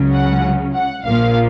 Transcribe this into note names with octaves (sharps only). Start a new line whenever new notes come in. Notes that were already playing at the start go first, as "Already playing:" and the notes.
Already playing: C#2 C#3 F#3 C#4
F#5
F#5
A#1 A#2 F3 A#3 F5